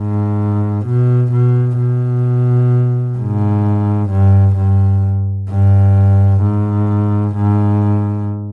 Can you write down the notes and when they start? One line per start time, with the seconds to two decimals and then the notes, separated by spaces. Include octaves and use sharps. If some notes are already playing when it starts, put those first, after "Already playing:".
Already playing: G#2
0.86 B2
1.32 B2
1.79 B2
3.18 G#2
4.10 G2
4.57 G2
5.49 G2
6.42 G#2
7.36 G#2